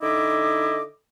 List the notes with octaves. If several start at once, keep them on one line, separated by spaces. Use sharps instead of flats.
D3 D#4 E4 D#5 D6